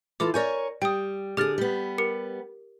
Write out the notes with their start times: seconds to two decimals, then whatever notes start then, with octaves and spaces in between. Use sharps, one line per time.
0.20 E3 F4 A4 D6
0.34 A#4 C#5 D5 G#5 G6
0.82 G3 G5 D#6
1.37 D3 G4 G#4 F6 A6
1.58 G3 B3
1.98 G4 A#4 C#7